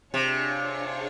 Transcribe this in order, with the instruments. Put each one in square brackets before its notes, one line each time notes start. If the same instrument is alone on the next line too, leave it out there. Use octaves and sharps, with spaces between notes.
[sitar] C3 [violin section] D4 F4 G#4 C#5